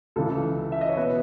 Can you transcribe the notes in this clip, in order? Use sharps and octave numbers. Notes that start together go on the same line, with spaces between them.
C#2 C#3 E3 A4
E5
D#5
C#5
B2 B4